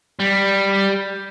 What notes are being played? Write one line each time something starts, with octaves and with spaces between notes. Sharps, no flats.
G3